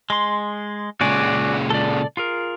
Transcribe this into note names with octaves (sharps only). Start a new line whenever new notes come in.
G#3 C6
A#2 C#3 G#3 F#4 D5 G#5
A4 D5
F4 G#4 A#4